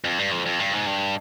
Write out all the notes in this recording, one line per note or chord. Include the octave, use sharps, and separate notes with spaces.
F2
G2
F2
F2
G2
G#2
G2